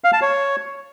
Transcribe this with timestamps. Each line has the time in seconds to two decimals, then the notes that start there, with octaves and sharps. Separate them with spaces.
0.04 F5
0.13 A5
0.22 C#5